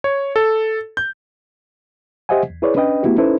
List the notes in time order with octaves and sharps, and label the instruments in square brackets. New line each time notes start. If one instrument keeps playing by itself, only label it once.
[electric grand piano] C#5
A4
G6
[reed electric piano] G4 C5 D#5 E5 F#5 G#5
E2
E4 G#4 B4 C#5 D5
C#4 D4 B4 D#5 G5
A3 B3 E4 F#4 G4
C#4 D#4 E4 A4 B4 C5